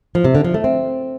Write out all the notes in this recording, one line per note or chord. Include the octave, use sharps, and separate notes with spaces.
F3
C3
D3
F3
A3
C4